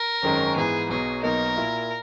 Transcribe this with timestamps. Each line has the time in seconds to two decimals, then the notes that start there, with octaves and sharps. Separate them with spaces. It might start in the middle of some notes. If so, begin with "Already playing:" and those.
Already playing: A#4
0.22 G#1 F#2 D#3 G#3 C#4
0.56 G#2 E3 B3 G#4
0.89 B1 B2 F#3 G#4
1.23 B1 B2 A#3 D#4 A#4
1.57 A#2 A#3 E4